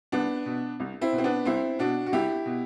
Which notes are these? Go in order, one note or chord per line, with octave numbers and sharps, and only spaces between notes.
C2 B3 D4
B2
C2
C4 E4
B2
C4
B3 D4
C2 C4 E4
B2 D4 F#4
F#4
C2 E4 G4
B2